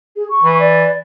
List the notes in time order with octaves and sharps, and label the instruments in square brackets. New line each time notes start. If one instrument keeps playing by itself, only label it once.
[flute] G#4
C#6
[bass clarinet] E3
[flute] D5